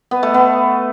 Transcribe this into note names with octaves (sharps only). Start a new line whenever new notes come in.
B3
A3
B3